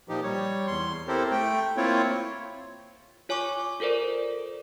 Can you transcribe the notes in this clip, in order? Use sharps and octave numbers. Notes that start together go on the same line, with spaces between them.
A#2 F3 D#4 G4
G3 C#5
E2 C6
C4 E4 G4 A4 A#4 C5
A3 G5
A#3 C4 E4 F4 C#5
F4 C#5 G#5 C#6 D6
F4 A4 A#4 C5 D5